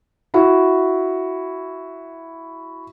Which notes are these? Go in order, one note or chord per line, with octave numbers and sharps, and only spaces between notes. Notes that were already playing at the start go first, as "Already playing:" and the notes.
E4 F#4